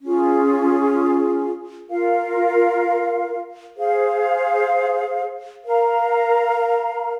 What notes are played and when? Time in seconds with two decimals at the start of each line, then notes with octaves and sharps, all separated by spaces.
0.03 C#4 F4 G#4
1.89 F4 A#4 F5
3.76 G#4 C5 F5
5.64 A#4 F5 A#5